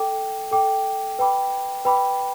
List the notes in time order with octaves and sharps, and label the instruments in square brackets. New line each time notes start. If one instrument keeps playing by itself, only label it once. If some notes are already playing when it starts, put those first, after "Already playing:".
Already playing: [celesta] A4 G5 D6
A4 G5 D6
B4 G5 B5 D6
B4 G5 B5 D6